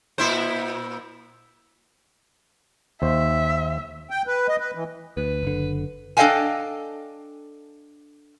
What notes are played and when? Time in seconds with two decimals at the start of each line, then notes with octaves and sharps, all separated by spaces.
0.18 A#2 E4 C5
3.02 D#2 C5 E5
4.10 G5
4.27 B4
4.48 D#5
4.60 B4
4.75 E3
5.17 D2 B4
5.43 F#1 D3
6.17 D4 A4 D#5 F5 G5 G#5